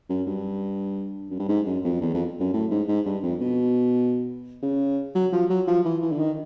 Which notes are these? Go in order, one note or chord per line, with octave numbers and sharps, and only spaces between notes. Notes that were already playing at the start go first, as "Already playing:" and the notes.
F#2
G2
F#2
G2
G#2
F#2
F2
E2
F2
F#2
A2
G#2
G#2
G2
F2
B2
C#3
F#3
F3
F#3
F3
E3
E3
D3
D#3